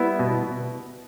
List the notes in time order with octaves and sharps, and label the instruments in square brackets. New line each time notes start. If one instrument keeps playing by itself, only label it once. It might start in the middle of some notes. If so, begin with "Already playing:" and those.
Already playing: [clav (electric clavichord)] G3 B3 E4 E5
B2